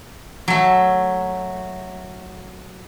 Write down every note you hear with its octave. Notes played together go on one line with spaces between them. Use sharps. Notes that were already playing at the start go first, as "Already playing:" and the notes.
F#3 A3